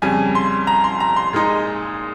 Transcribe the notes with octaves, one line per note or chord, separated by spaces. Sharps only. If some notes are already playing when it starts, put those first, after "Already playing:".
F2 C#3 G3 G#5
C6
A#5
C6
A#5
C6
A#2 G#3 D#4